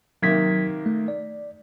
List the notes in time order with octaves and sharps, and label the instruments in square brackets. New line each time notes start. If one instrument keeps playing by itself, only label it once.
[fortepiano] C3 D#3 A#3 [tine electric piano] F#3 G#6 B6
[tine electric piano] A3
D5